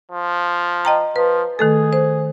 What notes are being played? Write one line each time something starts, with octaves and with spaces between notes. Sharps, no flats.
F3
D#5 G5 A#5
F3 B4
D#3 A3 G#4 A4
C5